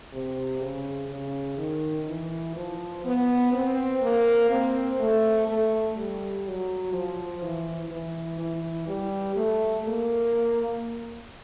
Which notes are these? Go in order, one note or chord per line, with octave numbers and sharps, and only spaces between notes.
C3
C#3
C#3
D#3
E3
F3
B3
C4
A#3
C4
A3
A3
G3
F#3
F3
E3
E3
E3
G3
A3
A#3